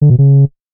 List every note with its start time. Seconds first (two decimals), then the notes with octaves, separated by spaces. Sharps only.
0.01 D3
0.10 B2
0.18 C#3